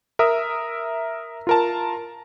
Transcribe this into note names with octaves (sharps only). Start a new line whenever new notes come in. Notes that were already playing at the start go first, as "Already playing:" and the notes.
A#4 E5 D#6 E6
F4 A#4 A5